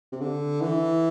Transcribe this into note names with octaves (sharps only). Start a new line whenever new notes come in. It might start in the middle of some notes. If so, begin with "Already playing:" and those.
C3
D3
E3